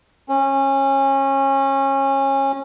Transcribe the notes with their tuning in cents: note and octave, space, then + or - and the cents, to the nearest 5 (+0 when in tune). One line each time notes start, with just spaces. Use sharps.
C#4 -25